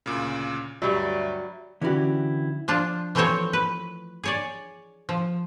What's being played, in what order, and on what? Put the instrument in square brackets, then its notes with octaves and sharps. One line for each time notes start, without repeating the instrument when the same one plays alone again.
[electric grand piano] D2 A#2 C#3
[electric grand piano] D2 G2 [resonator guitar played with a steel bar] F#3 G3 [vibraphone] E5
[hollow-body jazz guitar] D3 E3 C#4 E4 F#4 G4
[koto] F3 D4 F4
E3 F3 A3 C4 C5 C#5
B4
G#4 C#5 D5
F3